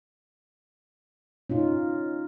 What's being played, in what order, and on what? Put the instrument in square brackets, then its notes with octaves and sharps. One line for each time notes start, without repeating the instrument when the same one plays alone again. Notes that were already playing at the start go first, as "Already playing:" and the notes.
[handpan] C#4 D#4 F4